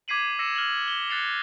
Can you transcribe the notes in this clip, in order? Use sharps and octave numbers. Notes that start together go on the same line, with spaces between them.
D6 G#6 B6 C7 D#7 F#7
D6 E6 A#6 C7 C#7 E7
F6 F#7
G7
F#6 A6 C7 C#7 F7